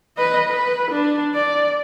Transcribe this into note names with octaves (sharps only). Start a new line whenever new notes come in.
B4 D#5
B4
D4
D5